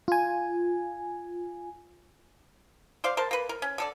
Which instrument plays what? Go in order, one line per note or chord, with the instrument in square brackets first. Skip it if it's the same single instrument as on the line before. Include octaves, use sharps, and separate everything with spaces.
[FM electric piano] F4 G#5
[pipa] C5 D5 F5
A#4 C5 A5
A#3 B4
A#4
C#4
D3 A4 D5